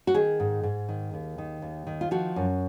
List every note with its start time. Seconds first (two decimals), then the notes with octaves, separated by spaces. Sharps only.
0.07 F#4
0.14 D#3 G#4
0.40 G#2
0.63 G#2
0.88 D#3
1.13 D#2
1.38 D#3
1.62 D#2
1.87 D#3
2.01 F4
2.11 F3 F#4
2.36 F#2